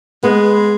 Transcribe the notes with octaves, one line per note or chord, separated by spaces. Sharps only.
G#3 B3